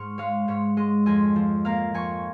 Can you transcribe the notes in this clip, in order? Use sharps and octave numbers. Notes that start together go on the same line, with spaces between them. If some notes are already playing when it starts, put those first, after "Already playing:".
Already playing: G#2 C#6 F6
G#3 C#5 F5
G#2 C#5
G#3 D#5
F2 D#5 G#5
F3
A#3 F5 A#5
F2 G#5 C#6